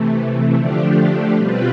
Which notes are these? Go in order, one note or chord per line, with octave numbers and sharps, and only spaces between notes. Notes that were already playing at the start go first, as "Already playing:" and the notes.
Already playing: C3 E3 A3
D3 F3 A3 D4 G4
B2 G3 C4 F4 B4